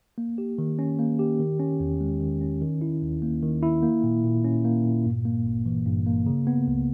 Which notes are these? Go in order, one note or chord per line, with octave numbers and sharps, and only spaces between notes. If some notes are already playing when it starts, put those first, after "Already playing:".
A#3
G4
D#3
C#4
A#3
G4
D#3
C#4
E2
G#3
D#3
C#4
D#3
E4
D#2
A#3
D#3
E4
A#3
A#2
A#2
C#4
A#3
A#2
G2
A#3
G#1
E3
G2
A#3
C#3
B3
C#2